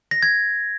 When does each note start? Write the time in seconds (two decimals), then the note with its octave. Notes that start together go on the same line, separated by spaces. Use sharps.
0.11 A#6
0.22 G#6